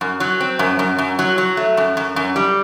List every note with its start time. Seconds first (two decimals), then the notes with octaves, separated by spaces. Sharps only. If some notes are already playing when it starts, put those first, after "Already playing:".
0.01 F#2
0.20 F#3
0.40 C4
0.59 F#2
0.79 F#2
0.98 F#2
1.19 F#3
1.38 F#3
1.57 A3
1.77 F#2
1.97 F#2
2.16 F#2
2.36 G3